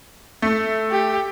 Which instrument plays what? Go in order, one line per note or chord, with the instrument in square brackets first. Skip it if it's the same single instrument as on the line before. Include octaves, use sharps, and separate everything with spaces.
[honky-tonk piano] A3
[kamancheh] G4